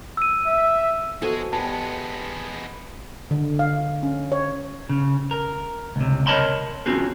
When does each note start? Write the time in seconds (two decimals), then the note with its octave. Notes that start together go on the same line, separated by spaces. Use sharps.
0.17 E6 D#7
0.47 E5
1.22 F3 G#3 B3 F#4 G#4 A4 G#5
1.53 E2 G#3 B3 G4 B4 A5
3.31 D3
3.59 F5
4.03 C#4
4.32 C#5
4.89 C#3
5.31 A#4
5.96 C#2 C3
6.27 A#4 C#5 D#5 A5 B5 C6
6.86 C4 C#4 F4 F#4 G#4